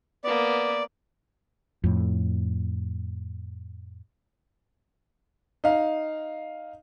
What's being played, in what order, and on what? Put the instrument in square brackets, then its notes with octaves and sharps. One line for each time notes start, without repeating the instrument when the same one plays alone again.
[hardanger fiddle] A#3 B3 [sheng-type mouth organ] D5
[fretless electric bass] F2 A2
[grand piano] D#4 F5